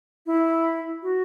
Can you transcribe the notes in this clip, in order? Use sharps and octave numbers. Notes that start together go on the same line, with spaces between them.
E4
F#4